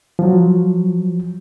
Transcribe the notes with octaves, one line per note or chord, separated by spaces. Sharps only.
F3 F#3